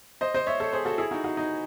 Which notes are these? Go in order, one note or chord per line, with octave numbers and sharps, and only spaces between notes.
C5 D#5
C5 D#5
C#5 E5
A4 C#5
G#4 C5
F#4 A4
E4 G#4
D#4 F#4
D#4 F#4
D#4